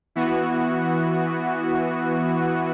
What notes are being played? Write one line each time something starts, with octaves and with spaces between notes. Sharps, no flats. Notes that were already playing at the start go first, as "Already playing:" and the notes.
E3 B3 F#4